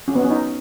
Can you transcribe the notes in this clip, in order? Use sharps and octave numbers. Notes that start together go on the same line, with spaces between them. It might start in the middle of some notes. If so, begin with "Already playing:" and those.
C#4
B3
C#4
D#4